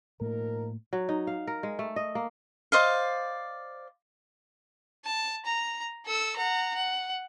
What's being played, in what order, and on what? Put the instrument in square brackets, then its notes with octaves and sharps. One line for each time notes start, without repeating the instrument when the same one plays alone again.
[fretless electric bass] A2 A3 A#3 [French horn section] F3 D#4 A#4
[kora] F#3
D#4
F5
A#4
G#3
A3
D#5
A#3
[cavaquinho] C5 D5 D#5 F5
[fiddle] A5
A#5
A4 E6
F#5 A#5
F#5